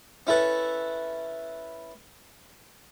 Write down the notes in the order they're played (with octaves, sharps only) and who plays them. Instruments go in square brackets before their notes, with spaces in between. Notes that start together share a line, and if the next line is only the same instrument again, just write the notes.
[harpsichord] C#4 E4 A4 B4